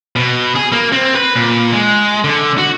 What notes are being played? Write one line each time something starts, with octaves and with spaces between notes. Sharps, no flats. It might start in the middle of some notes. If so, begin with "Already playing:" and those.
B2
G#4
A#3
C4
B4
A#2
G#3
D3
F#4